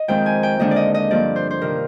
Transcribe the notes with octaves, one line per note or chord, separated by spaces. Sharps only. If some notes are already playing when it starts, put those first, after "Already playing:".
Already playing: D#5
F2 D#3 G#3 C4 G5
G#5
G5
D#2 D3 G#3 D4 D#5
D5
D#5
D#5
G2 F3 A#3 D5
C5
C5
C3 D#3 A#4